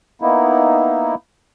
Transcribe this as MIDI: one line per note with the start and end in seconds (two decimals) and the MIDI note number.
0.22 1.15 58
0.22 1.15 59
0.22 1.15 63
0.22 1.15 64